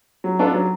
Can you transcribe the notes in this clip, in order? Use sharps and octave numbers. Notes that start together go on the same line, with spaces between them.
F#3
B3 D4 F4 A4
F#3